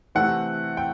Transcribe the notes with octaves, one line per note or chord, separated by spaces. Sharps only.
C3 E3 A3 C4 F#5
G5